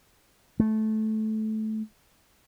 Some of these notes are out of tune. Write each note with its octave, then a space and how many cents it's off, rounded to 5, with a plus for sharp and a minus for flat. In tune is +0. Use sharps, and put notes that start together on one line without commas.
A3 -15